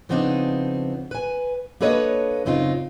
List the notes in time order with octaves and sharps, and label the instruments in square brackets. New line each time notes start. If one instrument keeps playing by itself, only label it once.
[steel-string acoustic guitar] C#3 F3 B3 C4 D4 D#4
B4 G#5
A#3 D4 A4 B4 C#5 D#5
F#2 C#3 C4 D#4 F4